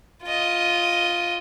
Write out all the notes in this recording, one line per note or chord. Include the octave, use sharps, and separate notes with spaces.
F4 D#5